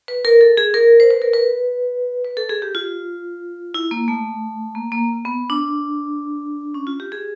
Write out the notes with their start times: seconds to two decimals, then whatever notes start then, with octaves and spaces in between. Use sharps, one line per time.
0.08 B4
0.25 A#4
0.41 A4
0.57 G#4
0.74 A#4
1.00 C5
1.10 B4
1.22 A#4
1.33 B4
2.25 B4
2.37 A4
2.49 G#4
2.62 G4
2.75 F4
3.74 E4
3.91 A#3
4.08 A3
4.75 A#3
4.92 A#3
5.25 B3
5.50 D4
6.74 C#4
6.87 F4
7.00 G4
7.12 G#4